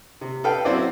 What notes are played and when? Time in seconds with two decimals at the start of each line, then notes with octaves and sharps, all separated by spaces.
0.21 C3
0.44 A4 B4 F5 G5
0.65 F#3 C4 C#4 E4 F#4 D5